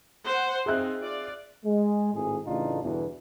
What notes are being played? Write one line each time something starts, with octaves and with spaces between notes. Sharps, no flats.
C5 F#5
C4 D#4 F4 G#4 E5 F#6
F4 D5
G#3
G#1 A2 G#4
A1 A2 C#3 D4 D#4 F4
E2 G2 B2 D3 E3